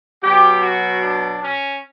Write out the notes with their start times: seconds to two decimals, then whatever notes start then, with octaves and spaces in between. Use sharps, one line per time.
0.22 B2 F#3 G4
0.62 F#4
1.02 D4
1.42 C#4